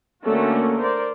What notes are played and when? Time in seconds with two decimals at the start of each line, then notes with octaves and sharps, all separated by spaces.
0.24 D3 A3 A#3 C#4 F#4
0.78 A#4 C5 D5